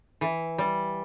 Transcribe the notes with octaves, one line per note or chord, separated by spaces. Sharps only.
E3
G3